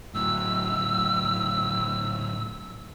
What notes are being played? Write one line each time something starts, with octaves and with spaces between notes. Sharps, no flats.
A2 F#3 E6